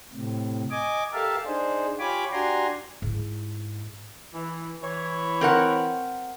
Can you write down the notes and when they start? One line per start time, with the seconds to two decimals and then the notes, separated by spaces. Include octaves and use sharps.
0.14 A2 C3
0.71 D#5 G#5 D6
1.13 G4 A4 A#4 E5 F5 A5
1.46 D4 D#4 G#4 C5
1.99 F4 G4 C#5 G#5 B5 D6
2.32 D4 F#4 G4 G#5 A#5 C6
3.02 G#2 E4
4.34 E3
4.83 E3 C#5
5.41 C4 A#4 F#5